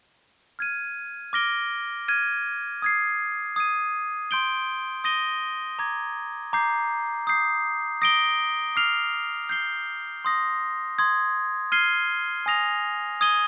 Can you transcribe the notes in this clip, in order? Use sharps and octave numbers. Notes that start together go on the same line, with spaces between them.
F6 G#6 D#7
D6 F6 A#6 D7 G7
F6 G#6 D#7
D#6 G#6 C7
D#6 G#6 D#7
C6 G6 D7 G7
D#6 A#6 D#7 G7
A#5 D6 G#6
A#5 D6 G6 C7
D#6 G6 C7
D#6 A#6 D7 G7
D6 F6 C7 F7
G6 C7 G7
C6 D#6 A#6
C6 D#6 G#6
F6 G#6 C7 D#7 G7
G#5 D#6 A#6 F7
D#6 G#6 D#7 G7